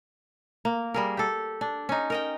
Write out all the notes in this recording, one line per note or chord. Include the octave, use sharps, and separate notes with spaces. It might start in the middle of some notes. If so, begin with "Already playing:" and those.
A#3
G3 G#4 A#4
G4 A4
D4
C#4 D#4
A#4 D#5 G5